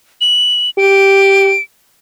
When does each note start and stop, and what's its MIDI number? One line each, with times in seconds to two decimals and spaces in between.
0.21 0.70 102
0.78 1.53 67
0.78 1.61 98